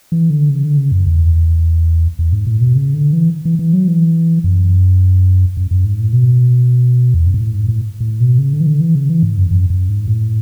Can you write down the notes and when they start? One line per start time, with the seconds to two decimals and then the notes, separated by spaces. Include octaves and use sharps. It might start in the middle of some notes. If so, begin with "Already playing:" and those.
0.12 E3
0.30 D3
0.50 C#3
0.64 D3
0.77 C#3
0.92 F#2
1.06 E2
2.19 E2
2.32 G#2
2.47 A2
2.61 B2
2.75 C#3
2.94 D3
3.13 E3
3.45 E3
3.59 E3
3.73 F#3
3.88 E3
4.44 F#2
5.57 F#2
5.71 F#2
5.85 G#2
5.99 A2
6.13 B2
7.14 E2
7.26 F#2
7.34 G#2
7.40 A2
7.54 G#2
7.68 A2
8.00 A2
8.20 B2
8.38 C#3
8.53 D3
8.61 E3
8.66 D3
8.81 E3
8.95 C#3
9.10 E3
9.23 G#2
9.38 F#2
9.51 F#2
9.70 F#2
9.89 G#2
10.08 A2